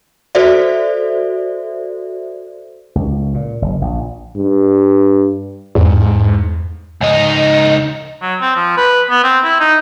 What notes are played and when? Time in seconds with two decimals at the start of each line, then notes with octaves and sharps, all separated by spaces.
0.35 F#4 A4 C5 D5 E5
2.95 C#2
3.34 A#2
3.62 F#1
3.82 A#1
4.37 G2
5.75 E2 G#2
7.01 C#2 D#4
8.22 F#3
8.41 C4
8.56 F3
8.77 B4
9.11 B3
9.24 C4
9.44 E4
9.60 D#4